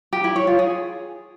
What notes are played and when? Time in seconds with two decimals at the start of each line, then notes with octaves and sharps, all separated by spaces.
0.13 G4
0.24 E4
0.36 C#5
0.47 F4
0.59 G#4